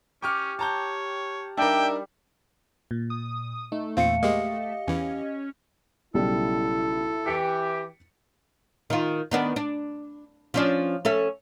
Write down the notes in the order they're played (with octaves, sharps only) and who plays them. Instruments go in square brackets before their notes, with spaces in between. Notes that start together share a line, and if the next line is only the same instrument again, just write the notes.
[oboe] C#4 [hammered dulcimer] G4 [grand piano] G5 C#6 F6
[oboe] C#5 [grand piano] A5 A#5 G6
[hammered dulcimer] G3 [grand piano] D4 D#4 A#4 [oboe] E5 [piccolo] G5
[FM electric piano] A#2
[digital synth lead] D#6
[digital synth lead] A3 [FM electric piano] D#4
[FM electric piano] E2 A#2 [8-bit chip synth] C4 F4 [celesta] F5 C#7
[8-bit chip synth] G#3 A#3 [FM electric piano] G4 D#5
[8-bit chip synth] E2 E3 [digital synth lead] C#4
[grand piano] B1 C#3 G3 [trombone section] E4 [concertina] A4
[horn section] E3 G4 [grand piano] B6 C#7 D7
[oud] D#3 F4
D#3 B3 D4
D4
F3 C#4 D4
C#4 A4 E5